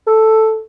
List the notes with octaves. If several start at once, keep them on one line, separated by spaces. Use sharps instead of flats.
A4